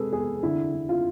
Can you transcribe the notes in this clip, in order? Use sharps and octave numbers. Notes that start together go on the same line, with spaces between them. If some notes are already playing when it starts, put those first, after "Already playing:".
Already playing: C3 G#3 G#4 A4 B4
E2 G#4
D3 E4
D3
F4